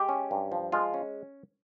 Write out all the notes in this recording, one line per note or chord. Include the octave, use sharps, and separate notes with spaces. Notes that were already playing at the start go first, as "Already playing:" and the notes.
Already playing: G#3 G4
C#4
G2
F3
G#3 F4
C#4